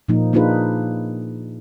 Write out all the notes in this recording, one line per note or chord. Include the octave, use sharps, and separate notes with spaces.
A#2 F3 A#3 D#4
A#3 D4 D#4 F4 G#4 B4